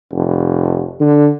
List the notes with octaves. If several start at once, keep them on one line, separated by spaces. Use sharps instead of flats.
F1
D3